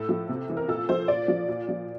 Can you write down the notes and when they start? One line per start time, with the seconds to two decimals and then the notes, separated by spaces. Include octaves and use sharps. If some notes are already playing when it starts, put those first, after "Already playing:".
Already playing: A2 A4
0.09 F3
0.29 C3
0.50 E3
0.57 A#4
0.68 A#2 A4
0.89 F3 C5
1.08 A#2 D5
1.28 F3
1.48 A#2
1.68 F3